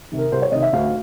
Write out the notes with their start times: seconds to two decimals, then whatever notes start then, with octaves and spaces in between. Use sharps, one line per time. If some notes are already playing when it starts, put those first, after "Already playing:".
0.12 C3 D#3
0.18 A#4
0.32 C2 C5
0.42 C#5
0.52 C3 D#3 D#5
0.62 E5
0.73 D2 F5